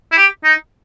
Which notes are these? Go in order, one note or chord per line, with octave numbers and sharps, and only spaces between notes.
E4
G4
D#4